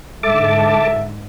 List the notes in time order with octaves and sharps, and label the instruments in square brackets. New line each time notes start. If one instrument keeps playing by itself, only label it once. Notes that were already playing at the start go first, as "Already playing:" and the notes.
[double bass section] G#2 D3 G#3 [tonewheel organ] A4 A5 D6 [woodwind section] E5